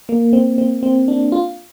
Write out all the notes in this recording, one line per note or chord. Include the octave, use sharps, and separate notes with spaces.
A#3
C4
C4
C4
D4
F4